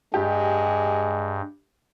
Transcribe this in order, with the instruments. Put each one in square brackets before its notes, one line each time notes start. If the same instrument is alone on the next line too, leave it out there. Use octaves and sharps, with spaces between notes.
[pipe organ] G2 [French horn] G#3 [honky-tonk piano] G4